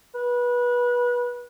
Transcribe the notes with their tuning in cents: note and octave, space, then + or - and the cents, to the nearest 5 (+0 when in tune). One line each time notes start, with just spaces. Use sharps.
B4 -25